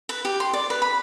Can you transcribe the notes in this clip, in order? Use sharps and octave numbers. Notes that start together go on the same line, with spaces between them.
B4
G4
C6
D5
B4
B5